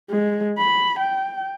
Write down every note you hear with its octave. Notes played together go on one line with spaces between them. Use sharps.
G#3
B5
G5